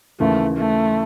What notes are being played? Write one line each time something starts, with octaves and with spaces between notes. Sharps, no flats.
D#2 C#3 E3 A3
A3